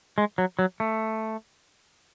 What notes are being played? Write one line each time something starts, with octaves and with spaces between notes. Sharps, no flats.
G#3
F#3
F#3
A3